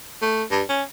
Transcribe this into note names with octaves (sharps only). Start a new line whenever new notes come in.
A3
G2
C#4